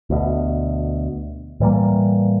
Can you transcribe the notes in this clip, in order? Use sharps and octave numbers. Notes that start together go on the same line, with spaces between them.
D2 B2
A2 E3 G3 A#3